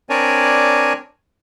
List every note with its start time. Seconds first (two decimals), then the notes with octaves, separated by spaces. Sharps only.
0.10 C4 D4 A#4 C#5 D5 G#5